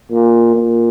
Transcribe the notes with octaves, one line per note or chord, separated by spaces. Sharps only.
A#2
A#2